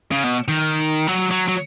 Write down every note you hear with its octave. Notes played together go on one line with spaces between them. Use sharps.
C#3
B2
D#3
F#3
F#3
F#3